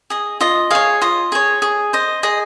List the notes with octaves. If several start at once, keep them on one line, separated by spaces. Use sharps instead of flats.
G#4 D#5
F4 D#5
G#4 C#5 F5
F4 D#5
G#4 C#5
G#4
C5 D#5
G#4 D#5